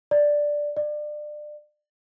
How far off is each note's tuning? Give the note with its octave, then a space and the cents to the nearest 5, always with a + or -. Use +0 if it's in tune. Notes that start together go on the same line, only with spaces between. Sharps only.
D5 +0
D5 +30